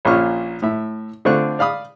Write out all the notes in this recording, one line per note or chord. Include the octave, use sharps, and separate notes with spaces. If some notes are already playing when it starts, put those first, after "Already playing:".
A#1 A#2 C#4 F4 C#6 F6
A2 E5
D3 A3 C4 F4 C#6 F#6
D5 F5 B5 D#6